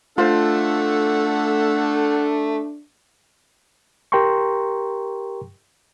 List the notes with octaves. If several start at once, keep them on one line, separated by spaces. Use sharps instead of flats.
A3 D4 F4 A4 C5 F#5
G4 A#4 G5 A#5 C6 C#6